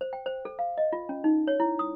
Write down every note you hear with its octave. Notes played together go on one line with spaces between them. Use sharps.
C5
G5
C5
A4
F5
D#5
F4
C#4
D#4
C#5
E4
D#6